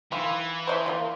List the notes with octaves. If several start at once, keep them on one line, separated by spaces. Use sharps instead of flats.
D#3 E3 F4
C5 D#5 E5
A#3 D4 F4